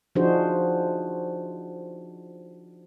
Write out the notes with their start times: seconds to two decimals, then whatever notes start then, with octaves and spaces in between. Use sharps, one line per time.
0.15 F3 D4 D#4 F#4 G#4 C5